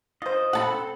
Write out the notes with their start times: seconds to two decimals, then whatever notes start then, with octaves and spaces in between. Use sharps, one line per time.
0.22 F4 C5 D#5
0.53 C4 A4 F#5 A5 B5